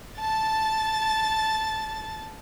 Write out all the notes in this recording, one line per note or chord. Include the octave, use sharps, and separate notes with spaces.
A5 A6